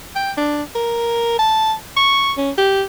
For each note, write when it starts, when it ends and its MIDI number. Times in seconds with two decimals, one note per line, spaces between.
0.15 0.32 79
0.37 0.62 62
0.75 1.38 70
1.39 1.74 81
1.97 2.32 85
2.37 2.51 61
2.58 2.83 67